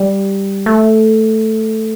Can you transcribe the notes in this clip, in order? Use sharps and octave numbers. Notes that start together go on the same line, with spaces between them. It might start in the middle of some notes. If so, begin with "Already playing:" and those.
Already playing: G3
A3